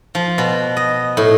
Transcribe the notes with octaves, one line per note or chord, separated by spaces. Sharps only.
F3
B2
D#5
A2